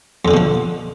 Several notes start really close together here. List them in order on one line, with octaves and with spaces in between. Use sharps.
F2 D3 D#3 B2 F3